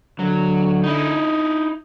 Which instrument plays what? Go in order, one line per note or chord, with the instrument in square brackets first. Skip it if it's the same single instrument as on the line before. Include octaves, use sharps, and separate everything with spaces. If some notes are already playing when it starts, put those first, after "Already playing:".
[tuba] D3 [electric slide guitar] F#3
[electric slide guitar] D#4 E4